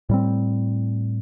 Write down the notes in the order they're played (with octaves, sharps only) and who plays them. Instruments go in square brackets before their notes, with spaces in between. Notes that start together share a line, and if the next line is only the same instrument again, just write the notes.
[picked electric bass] A2 G3 C4